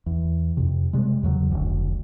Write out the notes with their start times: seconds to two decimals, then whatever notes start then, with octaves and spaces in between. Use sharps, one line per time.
0.06 E2
0.57 F2 C3
0.93 C3 G3 G#3
1.23 E2 C#3 F#3
1.52 F1 D2